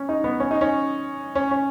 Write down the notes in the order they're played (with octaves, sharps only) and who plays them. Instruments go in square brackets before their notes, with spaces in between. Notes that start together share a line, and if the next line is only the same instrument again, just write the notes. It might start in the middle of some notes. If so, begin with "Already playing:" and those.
Already playing: [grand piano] C#4
D#4
B3
C#4
D#4
C#4
C#4
C#4